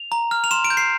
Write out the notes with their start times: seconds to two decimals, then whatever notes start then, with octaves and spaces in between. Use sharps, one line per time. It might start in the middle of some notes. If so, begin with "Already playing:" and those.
Already playing: F7
0.12 A#5
0.31 F6
0.44 F7
0.51 C6 E7
0.64 D7
0.70 G6
0.77 C7